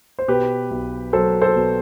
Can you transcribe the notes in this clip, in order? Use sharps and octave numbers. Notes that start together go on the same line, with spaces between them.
C5
B2 G4 B4
B1
F#3 A4 C5
A4 C5
B2